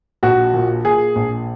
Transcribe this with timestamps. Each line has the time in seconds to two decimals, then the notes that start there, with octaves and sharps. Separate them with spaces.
0.23 A#1 F#4
0.54 A#2
0.85 A#2 G#4
1.16 A#1